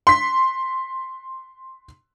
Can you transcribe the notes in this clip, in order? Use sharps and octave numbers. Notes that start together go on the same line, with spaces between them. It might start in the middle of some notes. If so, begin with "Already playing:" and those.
C6 B6